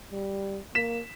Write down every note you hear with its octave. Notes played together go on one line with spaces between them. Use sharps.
G3
A#3 B6 E7